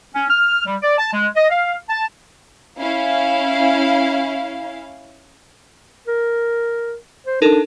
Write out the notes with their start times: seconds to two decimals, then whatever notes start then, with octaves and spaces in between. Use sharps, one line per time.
0.15 C#4
0.30 F6
0.66 G3
0.82 D5
0.98 A5
1.13 G#3
1.36 D#5
1.50 F5
1.90 A5
2.78 C#4 E4 F5
6.08 A#4
7.27 C5
7.42 D4 D#4 A4 A#4